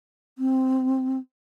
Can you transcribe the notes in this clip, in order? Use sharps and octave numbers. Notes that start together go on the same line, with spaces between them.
C4